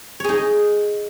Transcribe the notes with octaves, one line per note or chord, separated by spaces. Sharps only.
D#4 G#4 C#5